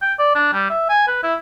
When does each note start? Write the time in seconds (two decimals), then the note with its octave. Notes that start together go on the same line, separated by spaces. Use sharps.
0.02 G5
0.19 D5
0.35 D4
0.53 G3
0.70 E5
0.89 G#5
1.08 B4
1.23 E4